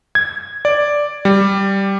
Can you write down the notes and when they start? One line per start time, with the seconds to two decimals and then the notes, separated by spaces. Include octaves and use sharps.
0.15 G#6
0.65 D5
1.25 G3